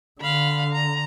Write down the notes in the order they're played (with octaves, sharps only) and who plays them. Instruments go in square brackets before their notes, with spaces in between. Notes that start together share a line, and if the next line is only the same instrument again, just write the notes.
[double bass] D3 [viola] F5 B5
[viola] A#5